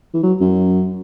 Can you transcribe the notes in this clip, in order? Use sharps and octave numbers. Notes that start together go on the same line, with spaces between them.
E3
F#3
F#2